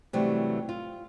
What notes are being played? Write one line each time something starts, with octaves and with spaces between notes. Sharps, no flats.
C3 E3 F#3 G3 A3
F4